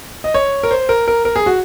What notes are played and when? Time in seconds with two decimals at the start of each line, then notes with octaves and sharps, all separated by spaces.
0.24 D#5
0.34 C#5
0.63 A#4
0.71 C5
0.89 A#4
1.08 A#4
1.25 A#4
1.36 G#4
1.46 F#4